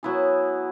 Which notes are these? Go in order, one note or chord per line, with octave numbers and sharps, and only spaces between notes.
F#3 B3 E4 G#4